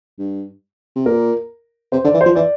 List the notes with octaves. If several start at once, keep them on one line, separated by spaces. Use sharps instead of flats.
G2
C3
A#2 A#4
C3 C5
D3 D5
E3
C5
F3
E3 D5